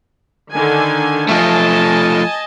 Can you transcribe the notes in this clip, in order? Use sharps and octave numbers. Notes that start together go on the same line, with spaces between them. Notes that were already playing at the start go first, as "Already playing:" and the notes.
D3 D#3 G#5
F3 A3 D#5 G#5 A5